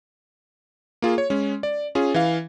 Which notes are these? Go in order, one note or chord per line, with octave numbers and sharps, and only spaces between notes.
A#3 F4 G#4
C#5
G#3 C#4
D5
C#4 F4 G#4
E3 F5